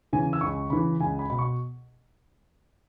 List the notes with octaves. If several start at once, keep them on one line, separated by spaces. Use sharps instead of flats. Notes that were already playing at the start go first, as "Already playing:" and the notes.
C#3 E3 G#5
E6
C#2 C#6
C#3 E3 B5
C#2 G#5
B5
B2 B5
C#6